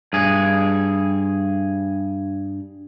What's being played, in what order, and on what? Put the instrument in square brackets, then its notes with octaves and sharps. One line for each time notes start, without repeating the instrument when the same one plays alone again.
[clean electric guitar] G2 G#4